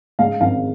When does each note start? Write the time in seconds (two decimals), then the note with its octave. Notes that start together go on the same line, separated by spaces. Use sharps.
0.19 G#2 F5
0.41 G#1 F5